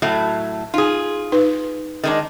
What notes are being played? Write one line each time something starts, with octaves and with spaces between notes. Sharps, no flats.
A2 F#3 A3
D#4 F4 G#4
D#4 B4
D#3 G#3 D4